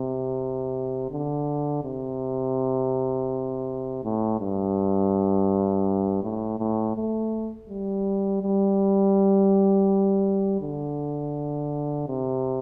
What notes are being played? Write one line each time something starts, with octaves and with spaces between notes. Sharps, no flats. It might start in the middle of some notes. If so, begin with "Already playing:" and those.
Already playing: C3
D3
C3
A2
G2
A2
A2
A3
G3
G3
D3
C3